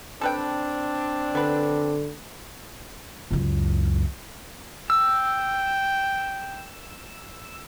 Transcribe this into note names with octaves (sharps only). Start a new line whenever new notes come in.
C4 D4 A4 B4 G5
D3 B3 B4
C#2 F#2
G5 E6